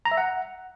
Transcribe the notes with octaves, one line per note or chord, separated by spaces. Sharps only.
A#5
E5
F#5